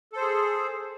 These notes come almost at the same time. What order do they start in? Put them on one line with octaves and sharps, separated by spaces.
A4 C5 G#4